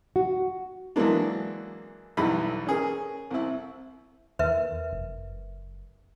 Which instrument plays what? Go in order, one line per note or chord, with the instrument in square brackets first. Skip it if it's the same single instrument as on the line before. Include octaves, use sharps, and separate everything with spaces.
[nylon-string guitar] F#4
[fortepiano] E3 F#3 G#3 A#3 D4
B1 E2 E3 G3 E4 B5
C#4 G#4 A#4
C2 E4
[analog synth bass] E2 [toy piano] A#4 B4 E5
[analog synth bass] F#1